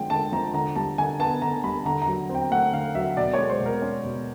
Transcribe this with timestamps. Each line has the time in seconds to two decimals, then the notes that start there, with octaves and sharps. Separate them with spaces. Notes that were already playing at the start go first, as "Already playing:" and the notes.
Already playing: D3 F3 G#3 G5
0.10 D3 A5
0.32 F3 A#5
0.54 D3 A#5
0.75 G3 A5
0.98 D3 G#5
1.20 B3 A5
1.42 D3 A#5
1.64 G3 B5
1.85 D3 A#5
2.02 A#5
2.07 F#3
2.29 C4
2.35 G5
2.51 A3 F#5
2.73 D3 F5
2.95 F#3 E5
3.17 B2 D5
3.34 G#3 C#5
3.50 C5
3.61 B2
3.66 A#4
3.82 C#4
4.04 B2